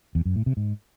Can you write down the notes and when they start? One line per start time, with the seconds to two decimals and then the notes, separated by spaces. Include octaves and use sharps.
0.15 E2
0.25 F#2
0.36 A2
0.46 C3
0.57 G#2